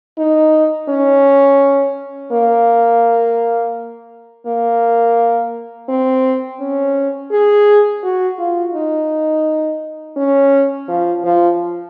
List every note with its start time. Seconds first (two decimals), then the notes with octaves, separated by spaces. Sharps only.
0.19 D#4
0.89 C#4
2.32 A#3
4.47 A#3
5.89 C4
6.60 C#4
7.32 G#4
8.03 F#4
8.39 F4
8.74 D#4
10.17 C#4
10.88 F3
11.24 F3